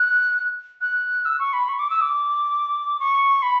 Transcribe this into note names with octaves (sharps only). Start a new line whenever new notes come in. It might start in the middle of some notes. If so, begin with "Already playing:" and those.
Already playing: F#6
F#6
E6
C#6
B5
C#6
D6
E6
D6
C#6
B5